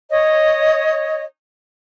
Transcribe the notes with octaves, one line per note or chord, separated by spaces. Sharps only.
C#5 D#5